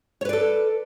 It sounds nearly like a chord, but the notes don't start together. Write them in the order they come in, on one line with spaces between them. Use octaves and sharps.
C#5 B4 D5 A4